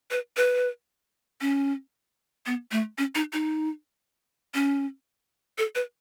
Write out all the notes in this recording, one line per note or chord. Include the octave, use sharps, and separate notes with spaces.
B4
B4
C#4
B3
A3
C#4
D#4
D#4
C#4
A4
B4